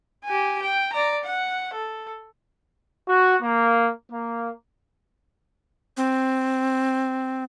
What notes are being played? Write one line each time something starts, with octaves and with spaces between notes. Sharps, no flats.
G4 G#5
G5
D5 A#5
F#5
A4
F#4
A#3
A#3
C4